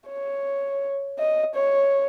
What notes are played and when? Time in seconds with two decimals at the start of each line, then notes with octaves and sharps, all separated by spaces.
0.09 C#5
1.18 D#5
1.55 C#5